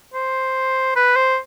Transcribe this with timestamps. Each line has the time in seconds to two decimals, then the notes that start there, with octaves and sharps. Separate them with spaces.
0.14 C5
0.96 B4
1.16 C5